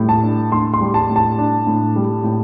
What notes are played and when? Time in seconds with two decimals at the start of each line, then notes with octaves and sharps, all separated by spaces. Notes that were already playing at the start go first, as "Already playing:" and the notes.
Already playing: A2 G3
0.09 A5
0.23 D4
0.52 A2 C6
0.74 C6
0.81 G3
0.94 A5
1.10 A2
1.16 A5
1.38 D4
1.67 A2
1.96 G3
2.24 A2